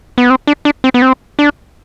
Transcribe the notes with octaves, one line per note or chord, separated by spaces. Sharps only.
B3
C4
D4
D4
C4
B3
C4
D4